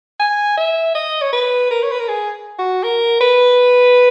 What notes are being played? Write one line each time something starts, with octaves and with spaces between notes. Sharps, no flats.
G#5
E5
D#5
C#5
B4
A#4
C#5
B4
A#4
G#4
F#4
A#4
B4